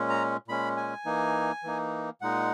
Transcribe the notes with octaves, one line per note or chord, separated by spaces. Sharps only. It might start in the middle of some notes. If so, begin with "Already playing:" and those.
Already playing: A#2 G#3 C#4
A#5
A#2 G#3 C#4 B5
G#5
E3 A#3 D#4
E3 A#3 D#4
A#2 G#3 D#4 F#5